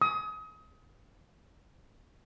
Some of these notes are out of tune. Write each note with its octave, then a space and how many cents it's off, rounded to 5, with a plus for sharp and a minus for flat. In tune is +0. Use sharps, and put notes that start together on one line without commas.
D#6 +30